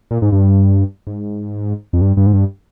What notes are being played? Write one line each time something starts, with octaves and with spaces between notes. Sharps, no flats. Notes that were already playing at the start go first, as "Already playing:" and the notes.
A#2
G#2
G2
G#2
F2
G2
G2
G#2
G2